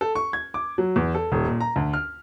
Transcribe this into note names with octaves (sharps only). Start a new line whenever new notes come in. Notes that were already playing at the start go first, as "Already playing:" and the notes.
A4
C#6
G#6
D6
F#3
E2
A4
D#1
A#2
A#5
D2
F6